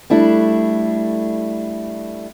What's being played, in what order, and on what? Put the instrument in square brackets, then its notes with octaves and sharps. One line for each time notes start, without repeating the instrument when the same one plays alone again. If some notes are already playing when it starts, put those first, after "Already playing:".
[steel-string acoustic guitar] G3 A3 D4 E4